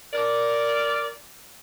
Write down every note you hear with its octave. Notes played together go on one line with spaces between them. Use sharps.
A#4 D5